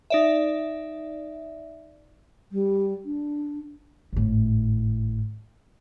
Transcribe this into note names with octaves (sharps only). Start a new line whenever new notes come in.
D#4 D5 E5
G3
D4
G#1 A2